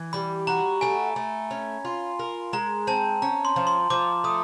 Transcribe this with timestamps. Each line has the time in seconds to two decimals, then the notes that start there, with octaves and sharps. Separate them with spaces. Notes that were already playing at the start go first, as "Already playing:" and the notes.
Already playing: E3
0.13 G3 B5
0.47 F#4 A#5
0.81 A3 G#5
1.16 A3
1.51 C#4
1.85 F4
2.19 A#4
2.53 G#3 A#5
2.87 C4 A5
3.22 C#4 A#5
3.45 C6
3.56 F3
3.67 C6
3.90 F3 D6
4.24 A3 D#6